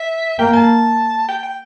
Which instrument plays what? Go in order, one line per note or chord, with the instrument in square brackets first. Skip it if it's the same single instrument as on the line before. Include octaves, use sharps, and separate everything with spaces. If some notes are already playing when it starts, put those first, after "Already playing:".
Already playing: [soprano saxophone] E5
[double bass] A#3 [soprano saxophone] G5
[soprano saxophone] A5
G5
G5